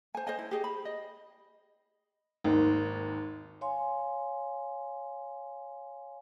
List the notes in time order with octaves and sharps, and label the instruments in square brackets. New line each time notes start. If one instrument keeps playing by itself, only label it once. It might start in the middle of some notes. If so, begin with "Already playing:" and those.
[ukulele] C5 G#5
C5 C#5 D#5 G#5
E4
G4 G#4 D#5
B5
D#5
[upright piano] G#1 D#2
[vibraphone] C#5 F5 G#5 C6